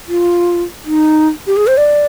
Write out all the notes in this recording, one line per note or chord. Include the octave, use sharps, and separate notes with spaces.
F4
D#4
G4
G#4
C5
D5